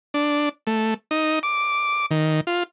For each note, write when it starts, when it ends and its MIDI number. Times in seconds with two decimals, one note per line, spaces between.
0.14 0.49 62
0.67 0.94 57
1.11 1.39 63
1.43 2.06 86
2.11 2.41 51
2.47 2.63 65